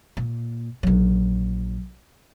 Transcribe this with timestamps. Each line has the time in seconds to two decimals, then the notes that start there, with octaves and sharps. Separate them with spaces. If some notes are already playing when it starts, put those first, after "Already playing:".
0.17 A#2
0.83 A#1 F#3